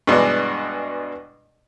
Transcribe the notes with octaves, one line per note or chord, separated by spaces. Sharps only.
G2 B2 E3 G#3 D4